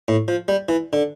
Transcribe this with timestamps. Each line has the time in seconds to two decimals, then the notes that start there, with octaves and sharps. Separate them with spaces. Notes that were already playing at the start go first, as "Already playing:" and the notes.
0.08 A2
0.28 F3
0.48 G3
0.69 E3
0.93 D3